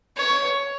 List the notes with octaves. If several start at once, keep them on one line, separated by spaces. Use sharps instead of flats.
C#5